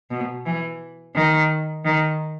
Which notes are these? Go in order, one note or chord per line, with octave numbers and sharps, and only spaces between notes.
B2
E3
D#3
D#3